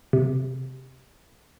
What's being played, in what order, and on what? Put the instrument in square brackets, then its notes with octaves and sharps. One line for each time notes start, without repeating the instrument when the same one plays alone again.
[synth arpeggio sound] C3